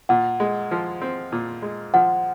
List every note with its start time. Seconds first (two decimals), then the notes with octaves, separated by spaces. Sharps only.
0.09 A#2 F#5
0.40 G#3
0.71 F3
1.02 C4
1.32 A#2
1.62 G#3
1.94 F3 F#5